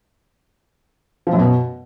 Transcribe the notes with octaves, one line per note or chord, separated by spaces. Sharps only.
F3
F#2
B2